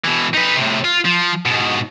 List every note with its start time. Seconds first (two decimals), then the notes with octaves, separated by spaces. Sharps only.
0.04 B2 E3
0.34 D#4 B4
0.56 A2 C3
0.84 F4
1.05 F3
1.46 G#2 B2